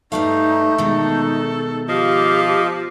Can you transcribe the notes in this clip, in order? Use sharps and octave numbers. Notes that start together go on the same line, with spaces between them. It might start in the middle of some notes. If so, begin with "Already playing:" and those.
G2 G3 A3 D#4 F5
B2 D#3 G#3 D#4 A4
F3 G4 D#5 F5